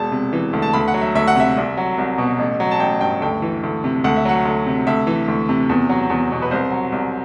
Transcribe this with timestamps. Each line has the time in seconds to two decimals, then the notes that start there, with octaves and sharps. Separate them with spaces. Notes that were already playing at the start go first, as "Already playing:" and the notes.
Already playing: E1 A5
0.12 C3
0.33 E3
0.53 D2
0.62 A5
0.73 D2 B5
0.88 F#5
0.94 F#3
1.01 E5
1.15 D2 E5
1.27 F#5
1.36 C3 E5
1.57 C2
1.77 F#3
1.98 C2
2.18 B2
2.39 A1
2.60 F#3
2.71 A5
2.80 A1 G5
3.01 G2 G5
3.22 D2 G5
3.42 E3
3.63 D2
3.84 C3
4.04 D2 F#5
4.16 E5
4.25 F#3 F#5
4.45 D2
4.66 C3
4.87 D2 E5
5.07 E3
5.28 D2
5.49 C3
5.69 E2
5.89 F#3
6.10 E2
6.32 B2
6.42 B4
6.51 C2 C5
6.72 F#3
6.92 C2